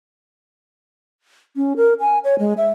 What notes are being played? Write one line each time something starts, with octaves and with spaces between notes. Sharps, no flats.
C#4
A#4
G#5
C#5
G#3
E5